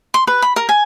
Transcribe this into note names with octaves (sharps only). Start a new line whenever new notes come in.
C6
B4
B5
A#4
G#5